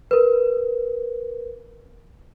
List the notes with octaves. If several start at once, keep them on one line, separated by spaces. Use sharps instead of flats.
A#4 B4